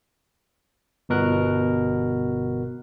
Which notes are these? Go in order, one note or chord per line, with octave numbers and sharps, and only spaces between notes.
G1 B2 A#4 F#6